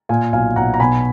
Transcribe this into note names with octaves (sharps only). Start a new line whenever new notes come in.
A#2 F5 G#5
B1 F5 G#5
B1 F#5 A#5
A#5
B2 G#5 B5